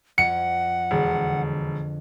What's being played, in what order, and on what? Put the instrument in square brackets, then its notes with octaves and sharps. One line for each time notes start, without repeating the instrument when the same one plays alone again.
[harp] F2 [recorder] F#5 [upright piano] C#7
[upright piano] E1 [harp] D3